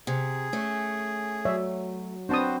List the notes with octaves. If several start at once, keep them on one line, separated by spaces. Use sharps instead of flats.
C3 G#4
A3 C#4
F#3 C#5 D5 E5
B3 C4 D4 F#4 B4 C5 A5 D#6